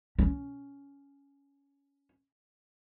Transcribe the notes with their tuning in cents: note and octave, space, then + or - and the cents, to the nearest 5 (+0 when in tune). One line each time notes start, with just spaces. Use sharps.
C#4 +15